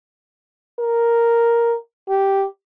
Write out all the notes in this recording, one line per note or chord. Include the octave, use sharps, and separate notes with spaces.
A#4
G4